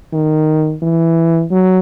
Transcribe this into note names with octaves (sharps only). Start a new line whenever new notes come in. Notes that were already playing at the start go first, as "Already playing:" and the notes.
D#3
E3
F#3